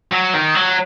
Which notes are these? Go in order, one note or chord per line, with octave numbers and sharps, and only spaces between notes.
F#3
D#3
F#3